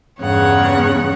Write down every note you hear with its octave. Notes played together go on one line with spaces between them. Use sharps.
E2 G2 C#3 C#5 F#5